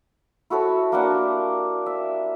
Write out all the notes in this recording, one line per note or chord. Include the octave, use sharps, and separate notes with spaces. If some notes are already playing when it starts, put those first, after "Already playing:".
E4 F#4 A4 C#5
A#3 D4 F#5
G4
E5